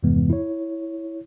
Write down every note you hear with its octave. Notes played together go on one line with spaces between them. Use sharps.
E2 G2 C3 E3 G#3 B3
E4 C#5